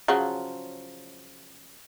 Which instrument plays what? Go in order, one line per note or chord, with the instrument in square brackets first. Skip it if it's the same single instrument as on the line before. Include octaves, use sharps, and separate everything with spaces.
[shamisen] C#3 F3 F#3